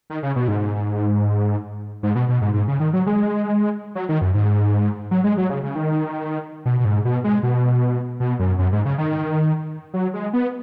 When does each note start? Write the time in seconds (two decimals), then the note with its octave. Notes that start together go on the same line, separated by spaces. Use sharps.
0.10 D#3
0.23 C#3
0.36 B2
0.48 G#2
2.03 G#2
2.15 B2
2.29 B2
2.41 G#2
2.54 G#2
2.68 C#3
2.80 D#3
2.93 F#3
3.06 G#3
3.95 F#3
4.09 D#3
4.22 F#2
4.34 G#2
5.11 F#3
5.24 G#3
5.37 F#3
5.50 C#3
5.63 C#3
5.75 D#3
6.65 B2
6.80 B2
6.85 G#2
7.05 B2
7.24 G#3
7.43 B2
8.20 B2
8.39 F#2
8.59 F#2
8.72 G#2
8.85 C#3
8.98 D#3
9.94 F#3
10.14 G#3
10.33 B3